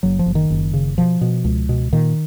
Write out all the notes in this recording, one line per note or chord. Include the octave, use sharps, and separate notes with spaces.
F#1 F#3
F3
F#1
D#3
F#1
C#3
B2 F3
B2
C#2
B2
A#2 D#3